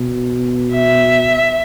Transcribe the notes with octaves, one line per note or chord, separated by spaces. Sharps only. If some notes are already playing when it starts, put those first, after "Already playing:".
Already playing: B2
E5